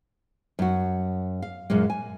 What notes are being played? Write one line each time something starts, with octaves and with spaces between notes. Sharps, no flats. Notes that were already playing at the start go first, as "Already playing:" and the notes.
F#2 F#4
F5
F#2 A#2 G#3 A#3
G#5